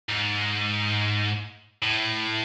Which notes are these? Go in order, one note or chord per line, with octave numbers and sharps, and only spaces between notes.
G#2
A2